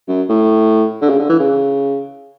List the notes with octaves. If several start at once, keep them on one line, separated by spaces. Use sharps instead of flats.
F#2
A2
D3
C#3
D3
E3
C#3